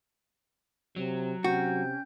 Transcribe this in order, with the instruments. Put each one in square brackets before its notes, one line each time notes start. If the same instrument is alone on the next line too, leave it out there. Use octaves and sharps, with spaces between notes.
[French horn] C3 [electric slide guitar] F#3
[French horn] C3 [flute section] C#4 G5 G6 [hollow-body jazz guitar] F#4